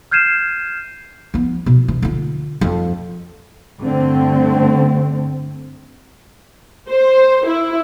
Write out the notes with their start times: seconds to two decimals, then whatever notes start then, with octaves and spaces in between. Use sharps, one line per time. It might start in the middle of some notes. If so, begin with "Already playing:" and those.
0.11 F6 G6 G#6 C7 D#7 E7
1.34 F3 B3
1.66 B2
1.88 E3
2.02 D3 F4
2.61 F2
3.81 G2 D3 A3 C4
6.89 C5
7.45 E4